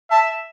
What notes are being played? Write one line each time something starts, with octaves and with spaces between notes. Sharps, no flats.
E5 A5